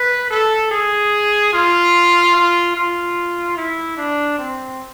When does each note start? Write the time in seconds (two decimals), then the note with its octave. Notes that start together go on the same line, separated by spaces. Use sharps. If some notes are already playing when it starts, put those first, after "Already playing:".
Already playing: B4
0.31 A4
0.71 G#4
1.53 F4
2.35 F4
2.76 F4
3.57 E4
3.97 D4
4.38 C4